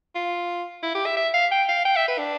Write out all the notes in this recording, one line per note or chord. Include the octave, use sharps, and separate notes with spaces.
F4
E4
G4
E5
E5
F5
G5
F5
G5
E5
B4
D4